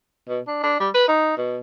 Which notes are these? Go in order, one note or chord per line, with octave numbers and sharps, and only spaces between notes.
B2
D4
D4
G3
B4
D#4
B2